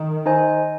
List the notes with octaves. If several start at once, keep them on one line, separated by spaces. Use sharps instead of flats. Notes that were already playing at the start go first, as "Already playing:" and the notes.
Already playing: D#3
D#4 C5 D#5 G#5